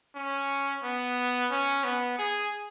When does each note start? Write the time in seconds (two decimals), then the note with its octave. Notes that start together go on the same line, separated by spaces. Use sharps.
0.15 C#4
0.83 B3
1.51 C#4
1.84 B3
2.19 G#4